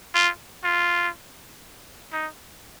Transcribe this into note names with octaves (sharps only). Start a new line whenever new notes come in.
F4
F4
D#4